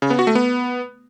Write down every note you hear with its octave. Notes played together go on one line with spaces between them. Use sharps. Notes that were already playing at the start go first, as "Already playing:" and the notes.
C#3
B3
F#4
A3
B3